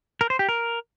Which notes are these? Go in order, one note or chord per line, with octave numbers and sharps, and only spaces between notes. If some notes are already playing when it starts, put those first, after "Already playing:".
A#4
C5
G4
A#4